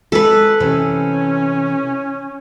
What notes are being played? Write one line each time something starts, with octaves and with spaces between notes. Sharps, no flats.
G#3 A4 B4
C3 E3 C#4